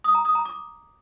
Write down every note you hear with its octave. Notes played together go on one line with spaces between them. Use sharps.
D#6
A#5
D#6
A#5
D6